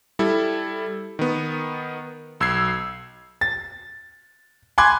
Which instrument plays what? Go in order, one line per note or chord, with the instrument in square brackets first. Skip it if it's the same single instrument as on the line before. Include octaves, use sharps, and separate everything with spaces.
[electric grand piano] G3 E4 A4
D#3 B3
B1 E6 G#6 C7
[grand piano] A6
G#5 B5 C6 D6 F#6 G#6